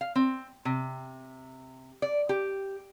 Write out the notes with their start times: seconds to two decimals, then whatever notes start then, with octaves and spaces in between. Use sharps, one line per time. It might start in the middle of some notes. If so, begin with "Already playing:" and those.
0.01 F5
0.16 C4
0.65 C3
2.02 D5
2.29 G4